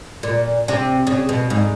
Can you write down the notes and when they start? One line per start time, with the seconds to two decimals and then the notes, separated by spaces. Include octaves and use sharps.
0.23 A#2
0.68 C3
1.07 C#3
1.29 B2
1.50 G#2